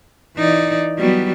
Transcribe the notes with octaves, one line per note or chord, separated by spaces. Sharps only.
E3 D#4 D5
F#3 G3 B3